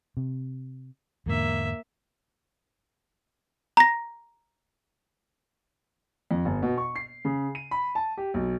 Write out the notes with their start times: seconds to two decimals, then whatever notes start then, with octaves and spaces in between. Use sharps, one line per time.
0.17 C3
1.26 E2 G#2 D3 A#3 E5
3.77 A#5 A#6
6.31 F2
6.45 G1
6.63 B2
6.78 C#6
6.96 C7
7.25 C#3
7.55 D#7
7.71 B5
7.95 A5
8.17 G4
8.34 B1